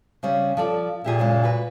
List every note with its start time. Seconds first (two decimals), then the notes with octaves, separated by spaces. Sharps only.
0.23 C#3 G3 C#4
0.57 F3 A4 D5
1.04 A#2 E4 G4 G#4
1.19 F#2 C#3 G#3
1.43 F#4 B4